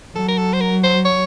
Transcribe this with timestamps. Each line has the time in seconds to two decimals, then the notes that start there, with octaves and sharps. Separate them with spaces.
0.16 F#3 A4
0.29 A#4
0.38 A4
0.53 C5
0.61 A#4
0.84 C5
1.05 C#5